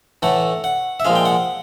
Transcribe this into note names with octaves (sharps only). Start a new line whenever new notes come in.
A2 E3 A3 F#5
F#5
E5
A#2 F3 G#3 F5
G5
F#5